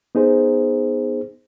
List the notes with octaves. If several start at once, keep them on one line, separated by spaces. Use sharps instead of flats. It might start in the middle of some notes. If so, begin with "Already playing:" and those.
B3 D#4 G#4 C5